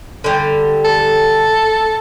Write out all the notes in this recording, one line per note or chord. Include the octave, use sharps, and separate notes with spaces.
D3 G3
A4